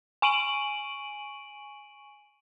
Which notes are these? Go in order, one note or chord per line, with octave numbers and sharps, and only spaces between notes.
G#5 C#6 D7 D#7 F#7